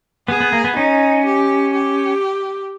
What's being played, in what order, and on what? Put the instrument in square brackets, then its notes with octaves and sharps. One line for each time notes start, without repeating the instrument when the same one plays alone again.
[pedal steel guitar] B3 [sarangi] G#4
[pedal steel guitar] B3
A#3
B3
[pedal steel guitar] C#4 [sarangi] D#4
[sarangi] G4
G4